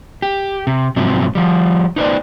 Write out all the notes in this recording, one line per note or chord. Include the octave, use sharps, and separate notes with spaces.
G4
C3
G#2 C3 F3 F#3 C4
F3 G3
D#4 B4 C5 D5